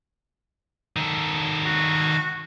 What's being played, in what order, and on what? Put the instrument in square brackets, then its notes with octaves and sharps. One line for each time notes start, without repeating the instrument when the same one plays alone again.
[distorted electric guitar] D#3 A4
[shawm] F#4